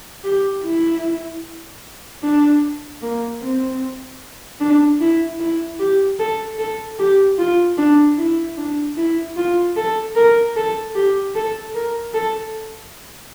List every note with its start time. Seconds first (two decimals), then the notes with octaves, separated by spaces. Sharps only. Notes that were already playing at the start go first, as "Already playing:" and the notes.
0.24 G4
0.64 E4
2.23 D4
3.02 A#3
3.42 C4
4.60 D4
5.00 E4
5.40 E4
5.80 G4
6.19 A4
6.59 A4
6.99 G4
7.39 F4
7.78 D4
8.18 E4
8.57 D4
8.97 E4
9.37 F4
9.77 A4
10.16 A#4
10.56 A4
10.95 G4
11.35 A4
11.74 A#4
12.14 A4